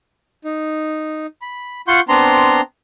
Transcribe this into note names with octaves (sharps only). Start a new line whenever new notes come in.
D#4
B5
F4 F#5 C6 C#6 G6
B3 C4 D4 A#5 C6